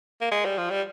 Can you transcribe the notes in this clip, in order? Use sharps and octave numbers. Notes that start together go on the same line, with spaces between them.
A#3
G#3
G3
F3
G3